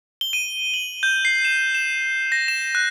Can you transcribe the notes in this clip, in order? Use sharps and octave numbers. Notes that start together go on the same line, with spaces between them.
G7
D#7
F#7
G6
C7
E7
E7
A#6
E7
F#6